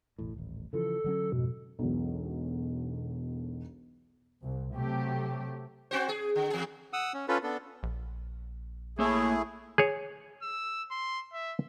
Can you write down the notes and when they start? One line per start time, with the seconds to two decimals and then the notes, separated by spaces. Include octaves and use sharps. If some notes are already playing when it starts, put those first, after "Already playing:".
0.19 E1 A1 A2
0.34 D#1 A1
0.73 C#3 E3 F3 A4
1.04 D3 F#3 C#4
1.32 F2 G#2 B2
1.79 E1 B1
4.42 C2
4.75 C3 F#3 A3 G4
5.91 C4 F#4 C5
6.09 G#4
6.36 D3
6.50 E2 G#4
6.93 F#5 D#6 E6
7.14 C#4
7.28 C#4 F4 A4 B4
7.43 B3 D4 A4
7.83 A#1
8.99 A3 A#3 E4 G#4 C#5
9.78 G#4 C#5
10.43 E6
10.91 C6
11.33 E5